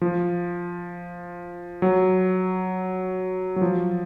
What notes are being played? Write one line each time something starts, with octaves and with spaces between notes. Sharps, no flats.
F3
F#3
F#3
F3